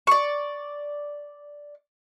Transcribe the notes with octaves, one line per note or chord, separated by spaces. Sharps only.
D5 C#6